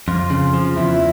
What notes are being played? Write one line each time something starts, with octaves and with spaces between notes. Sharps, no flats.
F2 F4
C#3
F3
F4
E2 E4